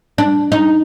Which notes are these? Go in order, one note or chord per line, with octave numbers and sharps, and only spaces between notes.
D4
D#4